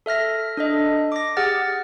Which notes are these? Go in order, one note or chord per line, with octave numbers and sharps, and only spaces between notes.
A4 E5 F6 A#6
D4 A4 D#5
D6 A#6
G4 G#4 F#5 F6 A6